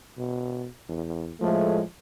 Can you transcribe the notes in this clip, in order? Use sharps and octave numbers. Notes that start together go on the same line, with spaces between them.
B2
E2
A2 F3 G#3 A3